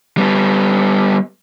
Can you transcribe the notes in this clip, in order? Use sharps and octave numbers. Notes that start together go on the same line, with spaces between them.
G3 B3